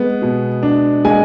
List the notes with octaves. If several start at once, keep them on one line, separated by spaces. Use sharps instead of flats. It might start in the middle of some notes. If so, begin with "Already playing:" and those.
Already playing: G#3 B3
B2
D4
G#3 G#5